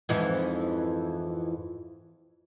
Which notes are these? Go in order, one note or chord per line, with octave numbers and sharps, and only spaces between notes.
F2 G#2 E3